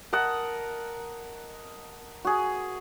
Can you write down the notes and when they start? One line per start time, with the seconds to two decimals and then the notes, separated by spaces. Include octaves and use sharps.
0.13 A#4 D#5 F#5 A5
2.25 F#4 G#4